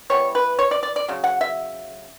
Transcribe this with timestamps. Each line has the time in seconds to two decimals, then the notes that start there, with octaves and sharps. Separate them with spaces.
0.10 E3 G3 B3 C#5
0.35 B4
0.59 C#5
0.71 D5
0.83 D5
0.96 D5
1.08 C#3 F#3
1.24 F#5
1.41 E5